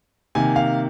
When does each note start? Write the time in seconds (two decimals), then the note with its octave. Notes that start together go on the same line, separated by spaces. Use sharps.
0.35 C3 D#3 A#3 G#5
0.56 F5